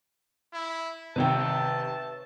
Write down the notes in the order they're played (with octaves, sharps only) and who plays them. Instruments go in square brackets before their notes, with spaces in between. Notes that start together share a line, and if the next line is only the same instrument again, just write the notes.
[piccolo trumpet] E4
[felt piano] C3 D#3 G5 [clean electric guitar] B4 C#5 E5 [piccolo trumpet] A5